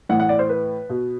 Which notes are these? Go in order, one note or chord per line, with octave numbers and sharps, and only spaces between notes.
A2 E3 F#5
F#5
D5
C5
B4
B2